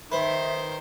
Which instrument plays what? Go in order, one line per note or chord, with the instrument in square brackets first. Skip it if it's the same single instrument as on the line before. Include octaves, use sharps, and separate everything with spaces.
[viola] D#3 [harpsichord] B4 [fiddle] C5 [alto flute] E5